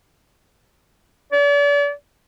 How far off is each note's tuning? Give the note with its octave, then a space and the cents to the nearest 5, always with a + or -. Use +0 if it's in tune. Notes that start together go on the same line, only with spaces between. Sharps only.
D5 -40